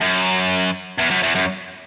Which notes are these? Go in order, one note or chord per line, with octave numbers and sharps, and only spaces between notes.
F#2
E2
F#2
E2
F#2